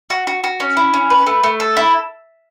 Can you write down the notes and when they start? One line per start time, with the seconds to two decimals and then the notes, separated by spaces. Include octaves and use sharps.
0.10 F#4
0.27 F#4
0.44 F#4
0.60 C#4
0.77 E4
0.93 C#4
1.10 B4
1.26 A3
1.43 A3
1.60 A4
1.77 E4